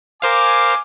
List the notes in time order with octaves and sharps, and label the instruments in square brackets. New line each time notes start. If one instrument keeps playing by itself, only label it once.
[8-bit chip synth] A#4 C5 F5 [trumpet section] G#5 D6